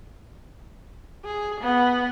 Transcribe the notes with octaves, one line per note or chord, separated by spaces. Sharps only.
G#4
B3